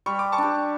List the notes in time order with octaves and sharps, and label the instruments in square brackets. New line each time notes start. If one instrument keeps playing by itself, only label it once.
[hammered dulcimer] G3 [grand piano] C#6
[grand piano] D6
A5 C#6
[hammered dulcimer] D4 G4